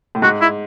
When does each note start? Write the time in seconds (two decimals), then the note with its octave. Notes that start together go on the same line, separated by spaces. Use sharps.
0.15 A2
0.22 G#2 F#4
0.41 E4